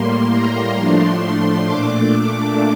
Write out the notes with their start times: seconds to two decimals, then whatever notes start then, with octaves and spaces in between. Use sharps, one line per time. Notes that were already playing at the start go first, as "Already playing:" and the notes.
Already playing: A2 G3 A#3 C6
0.31 A#5
0.76 A2 F3 A3 D4 C6
1.65 A#2 A3 D4 D6
2.09 D6